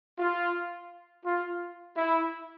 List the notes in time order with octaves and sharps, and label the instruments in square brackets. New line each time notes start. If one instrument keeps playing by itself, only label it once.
[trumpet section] F4
F4
E4